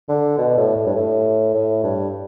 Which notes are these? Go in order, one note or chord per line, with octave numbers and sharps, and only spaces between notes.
D3
B2
A2
A2
G2
A2
A2
G2